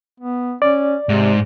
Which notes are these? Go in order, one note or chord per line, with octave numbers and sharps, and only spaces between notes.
B3
C#4 D5
G#2 C3